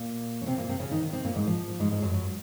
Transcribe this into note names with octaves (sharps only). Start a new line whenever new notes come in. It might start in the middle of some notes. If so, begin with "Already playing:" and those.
Already playing: A#2 A#3
C#4
C3 C4
A#2 A#3
C3 C4
C#3 C#4
D#3 D#4
D#3 D#4
C3 C4
A#2 A#3
G#2 G#3
F3
G#2 G#3
G#2 G#3
F#2 F#3
F#2 F#3